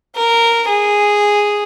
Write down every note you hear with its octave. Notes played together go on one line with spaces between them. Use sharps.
A#4
G#4